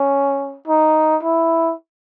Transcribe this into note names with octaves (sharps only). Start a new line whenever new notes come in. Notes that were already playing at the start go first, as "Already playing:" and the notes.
Already playing: C#4
D#4
E4